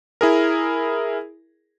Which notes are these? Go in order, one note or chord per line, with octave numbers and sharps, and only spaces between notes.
E4 G#4 A#4